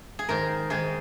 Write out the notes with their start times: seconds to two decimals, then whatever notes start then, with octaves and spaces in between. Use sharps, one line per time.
0.19 G#4
0.29 G#2 D#3 A#4
0.70 G#2 D#3 G#4